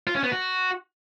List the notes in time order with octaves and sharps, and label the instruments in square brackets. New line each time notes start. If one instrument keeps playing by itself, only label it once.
[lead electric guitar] F4
C#4
B3
F#4